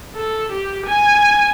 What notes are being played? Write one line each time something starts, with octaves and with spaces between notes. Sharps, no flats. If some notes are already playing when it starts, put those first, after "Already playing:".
A4
G4
G#5